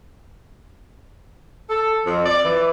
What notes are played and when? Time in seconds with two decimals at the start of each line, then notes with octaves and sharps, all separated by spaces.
1.70 A4
2.06 F2
2.26 D5
2.45 E3